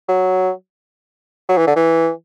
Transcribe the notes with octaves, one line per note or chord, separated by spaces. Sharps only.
F#3
F#3
E3
D3
E3